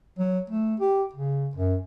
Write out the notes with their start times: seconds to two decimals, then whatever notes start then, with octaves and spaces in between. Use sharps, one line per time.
0.19 F#3
0.50 A3
0.80 G4
1.13 C#3
1.55 F#2